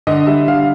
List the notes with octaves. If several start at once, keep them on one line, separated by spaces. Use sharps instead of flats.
D3 D#5
G3 E5
D3 F5